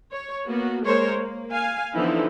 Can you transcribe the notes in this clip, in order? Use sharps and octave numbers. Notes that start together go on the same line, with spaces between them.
C#5
A#3 B3 F#4
G#3 A#3 A#4 C5 C#5
A#3
F5 G#5
D3 E3 F3 B3 D#4 E4